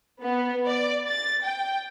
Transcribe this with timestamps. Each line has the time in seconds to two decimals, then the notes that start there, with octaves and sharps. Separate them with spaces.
0.22 B3
0.68 D5
1.07 A6
1.44 G5